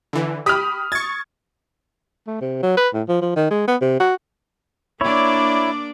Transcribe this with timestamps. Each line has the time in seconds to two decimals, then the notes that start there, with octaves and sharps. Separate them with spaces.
0.13 D3 E3
0.46 G4 B5 D#6 F6
0.92 C#6 G#6 A6
2.27 A3
2.41 C3
2.63 F#3
2.77 B4
2.94 A2
3.08 F3
3.21 F3
3.36 D#3
3.51 G#3
3.68 B3
3.81 C3
4.00 F#4
5.01 A#3 D4 E4 C#5 D5